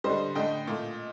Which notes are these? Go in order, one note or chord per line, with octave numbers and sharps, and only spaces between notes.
G3 C5 D#5
D3
D3 A3 D#5 G5
A#2 A3